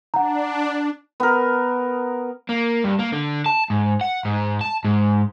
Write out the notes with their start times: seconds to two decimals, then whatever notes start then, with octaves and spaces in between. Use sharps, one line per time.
0.14 D4 F#5 A#5
1.20 B3 A#4
2.49 A#3
2.84 G2
2.99 A#3
3.12 D3
3.46 A5
3.70 G#2
4.01 F#5
4.25 G#2
4.61 A5
4.84 G#2